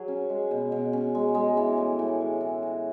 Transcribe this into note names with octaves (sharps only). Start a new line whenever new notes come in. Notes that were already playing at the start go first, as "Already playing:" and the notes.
Already playing: F#3 G#4
C#4
G#3
B2
B2
C#4
G#3
G#3
E3
A2
A2
G#3
E3
F#4